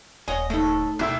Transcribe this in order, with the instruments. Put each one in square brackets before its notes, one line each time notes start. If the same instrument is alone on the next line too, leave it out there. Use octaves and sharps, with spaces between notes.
[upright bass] D#1 [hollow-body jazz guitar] C#5 F#5 G#5 [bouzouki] D#5
[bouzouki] A2 A4 [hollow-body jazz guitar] A3 D#4
[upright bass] E1 G#3 [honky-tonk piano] C2 E4 E6 [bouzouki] G4